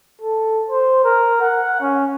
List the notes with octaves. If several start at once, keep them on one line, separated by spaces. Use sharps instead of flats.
A4
C5
A#4
F#5
C#4